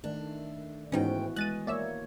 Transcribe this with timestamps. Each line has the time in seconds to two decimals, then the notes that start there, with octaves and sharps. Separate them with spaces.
0.04 D#3 A3 D4
0.92 D2 G#2 E3 B3 C#4 D#4 F#4 G5
1.36 G#3 F#6 A6 D#7
1.67 A#3 C#5 D5 E5 E6